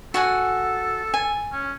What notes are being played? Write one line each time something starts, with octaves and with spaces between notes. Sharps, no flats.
F#4 A4 F#5 G#5
G#5
C#4